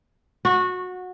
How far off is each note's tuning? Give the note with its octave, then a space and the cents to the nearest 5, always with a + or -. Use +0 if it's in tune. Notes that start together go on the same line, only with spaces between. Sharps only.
F#4 -20